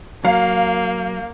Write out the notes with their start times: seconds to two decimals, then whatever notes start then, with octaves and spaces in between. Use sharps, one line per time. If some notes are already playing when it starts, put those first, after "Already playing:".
0.25 F#3 A#3 F5